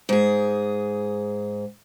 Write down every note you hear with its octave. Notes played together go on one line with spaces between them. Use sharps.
G#2 G#4